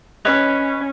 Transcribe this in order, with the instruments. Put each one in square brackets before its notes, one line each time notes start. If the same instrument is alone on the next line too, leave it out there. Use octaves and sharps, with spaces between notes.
[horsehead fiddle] C#4 [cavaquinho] B4 C#5 D#5